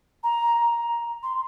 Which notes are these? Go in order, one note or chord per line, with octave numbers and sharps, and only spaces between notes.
A#5
C6